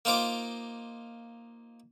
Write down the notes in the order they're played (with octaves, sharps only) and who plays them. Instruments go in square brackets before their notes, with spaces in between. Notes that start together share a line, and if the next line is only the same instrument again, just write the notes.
[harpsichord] A#3 D#4 F4 C5 D6